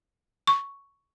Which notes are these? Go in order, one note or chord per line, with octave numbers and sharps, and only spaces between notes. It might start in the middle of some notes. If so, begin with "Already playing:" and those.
C#6